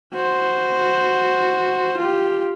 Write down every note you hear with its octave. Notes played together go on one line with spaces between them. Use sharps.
F#4 C5
F4 G4